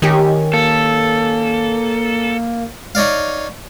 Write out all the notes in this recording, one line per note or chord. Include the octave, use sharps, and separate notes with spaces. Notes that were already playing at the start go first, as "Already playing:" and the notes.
D#3 C#4 G4
A#3 A4
D#4 C#5 D5 F5